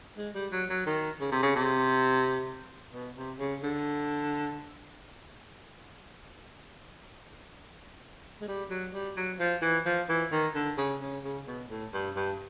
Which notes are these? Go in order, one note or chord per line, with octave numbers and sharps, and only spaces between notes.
G#3
G3
F#3
F#3
D#3
C#3
C3
C#3
C3
B2
C3
C#3
D3
G#3
G3
F#3
G3
F#3
F3
E3
F3
E3
D#3
D3
C#3
C#3
C#3
B2
A2
G2
G2